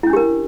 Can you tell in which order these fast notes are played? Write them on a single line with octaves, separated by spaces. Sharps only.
E4 C#4 D4 G4 A#4